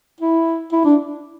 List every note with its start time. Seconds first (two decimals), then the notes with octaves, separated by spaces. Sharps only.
0.21 E4
0.72 E4
0.85 D4